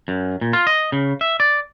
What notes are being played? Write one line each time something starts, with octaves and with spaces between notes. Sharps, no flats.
F#2
A#2
F4
D#5
C#3
E5
D5